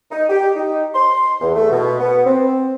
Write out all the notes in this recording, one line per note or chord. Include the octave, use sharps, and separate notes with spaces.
D#4
G4
D#4
C6
E2
A3
B2
B3
C4